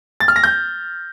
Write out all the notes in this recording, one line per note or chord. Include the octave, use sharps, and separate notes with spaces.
A6
F6
A#6
G6